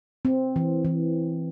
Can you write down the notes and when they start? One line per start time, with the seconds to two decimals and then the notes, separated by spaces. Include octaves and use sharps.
0.25 C4
0.56 E3
0.85 E3